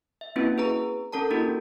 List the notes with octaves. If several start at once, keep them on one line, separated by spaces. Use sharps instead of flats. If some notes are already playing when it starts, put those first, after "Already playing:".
E5
A#3 C4 C#4 E4 F#4 B4
G#4 B4 A#5
C#4 A4 A#4 A5 A#5
A#3 C#4 D4 E4 F#4 G4